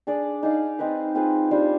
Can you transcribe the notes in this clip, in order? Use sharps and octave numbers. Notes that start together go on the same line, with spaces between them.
D4 G#4 D5
D#4 G#4 D5 F5
C4 D#4 B4
C4 F4 G#4 B4
G3 D4 F4 C5